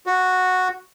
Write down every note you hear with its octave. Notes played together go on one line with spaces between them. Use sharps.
F#4